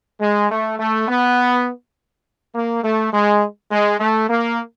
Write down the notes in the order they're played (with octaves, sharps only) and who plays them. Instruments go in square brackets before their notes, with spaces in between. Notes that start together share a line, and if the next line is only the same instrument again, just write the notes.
[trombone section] G#3
A3
A3
B3
A#3
A3
G#3
G#3
A3
A#3